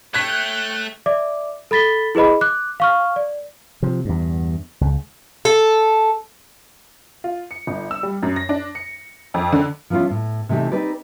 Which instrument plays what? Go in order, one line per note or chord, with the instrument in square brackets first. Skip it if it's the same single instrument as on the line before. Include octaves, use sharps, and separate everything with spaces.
[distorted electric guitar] A3 [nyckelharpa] C#5 G5 [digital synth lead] F#6 [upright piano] G#6 B6
[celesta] D5 E5 D6
A4 B5 A6 B6 G7
E4 G#4 B4 D#5 B5
D6 F#6
F5 C#6 F6
D5
[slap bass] C3 F3
E2 G2
C#2
[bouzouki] A4
[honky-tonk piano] F4
C#7
G1
E6
G3
F#2
A#6
D4
C#7
F2
D3
[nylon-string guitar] F3 B3 C#4 E4 F4
A2
C3 E3 A3 D#4 G4
C4 D#4 G4 B4 D5